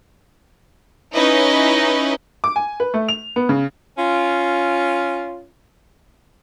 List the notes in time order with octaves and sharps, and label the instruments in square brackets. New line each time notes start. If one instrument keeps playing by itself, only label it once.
[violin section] C#4 D#4 E4 B4 D#5
[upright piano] D6
G#5
B4
A3
F7
B3
C#3
[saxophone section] C#4 F4